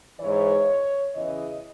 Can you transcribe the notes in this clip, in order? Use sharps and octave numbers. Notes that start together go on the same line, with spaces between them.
G#2 E3 C#5
E2 C#3 E3 D#5